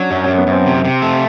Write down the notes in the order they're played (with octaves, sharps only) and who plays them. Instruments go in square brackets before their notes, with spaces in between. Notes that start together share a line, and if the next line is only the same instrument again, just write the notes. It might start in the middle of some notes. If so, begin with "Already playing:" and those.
Already playing: [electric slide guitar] F#3 [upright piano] C#4 D4
[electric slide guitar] F#2 [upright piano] C#4
[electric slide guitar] F#2 [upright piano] C#4
[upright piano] B3
[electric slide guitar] F#2
[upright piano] C4
[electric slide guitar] C3
C3
A3